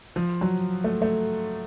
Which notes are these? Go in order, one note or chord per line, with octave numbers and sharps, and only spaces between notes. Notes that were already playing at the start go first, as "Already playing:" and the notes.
F3
F#3
A3
A3